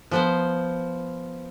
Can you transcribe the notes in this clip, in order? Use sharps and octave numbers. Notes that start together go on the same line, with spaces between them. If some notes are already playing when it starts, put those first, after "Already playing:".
F3 B3 C5